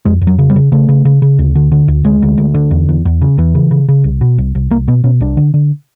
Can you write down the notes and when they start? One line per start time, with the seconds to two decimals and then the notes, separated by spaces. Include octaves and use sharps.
0.05 F2 G#3
0.21 F2
0.27 F#3
0.39 C#3
0.50 G3
0.56 C#3
0.72 C#3 A3
0.89 C#3
1.05 C#3
1.22 C#3
1.39 D2
1.55 D3
1.72 D3
1.88 D2
2.04 D2 G#3
2.22 D2
2.38 D2
2.54 D3
2.71 E2
2.89 E2
3.05 E2
3.21 C#3
3.38 E2 E3
3.55 C#3
3.71 C#3
3.89 C#3
4.04 C2
4.21 B2
4.38 C2
4.55 C2
4.70 C2 A#3
4.88 B2 B3
5.04 B2 C#4
5.20 C2 D4
5.37 D3
5.54 D3